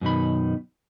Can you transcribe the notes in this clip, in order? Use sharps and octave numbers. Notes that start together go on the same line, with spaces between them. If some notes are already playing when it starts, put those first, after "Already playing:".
F#2 B2 D#3 B5